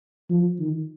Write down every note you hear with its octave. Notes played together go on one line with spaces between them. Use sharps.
F3
D#3